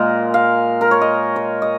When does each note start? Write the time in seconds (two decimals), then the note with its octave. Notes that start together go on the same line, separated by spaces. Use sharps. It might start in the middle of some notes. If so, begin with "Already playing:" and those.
Already playing: A#2 G#3 A#4
0.34 F5
0.81 A#4
0.91 C#5
1.01 D#5
1.36 C#5
1.62 D#5